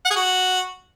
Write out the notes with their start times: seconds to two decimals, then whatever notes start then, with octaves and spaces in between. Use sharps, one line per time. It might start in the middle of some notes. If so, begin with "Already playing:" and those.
0.05 F#5
0.10 G#4
0.16 F#4